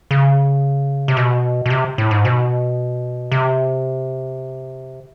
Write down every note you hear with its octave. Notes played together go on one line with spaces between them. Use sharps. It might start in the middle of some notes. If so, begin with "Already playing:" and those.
C#3
C3
B2
B2
C3
A2
G#2
B2
C3